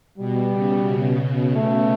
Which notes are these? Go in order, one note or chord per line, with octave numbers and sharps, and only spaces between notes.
B2 G3
C#3
B2
A3